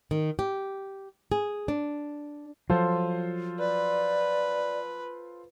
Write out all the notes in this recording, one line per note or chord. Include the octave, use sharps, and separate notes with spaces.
D#3
G4
G#4
D4
F3 F#3 F4 A4 C5
B4 D5